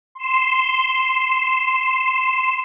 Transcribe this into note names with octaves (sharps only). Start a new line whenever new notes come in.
C6 E7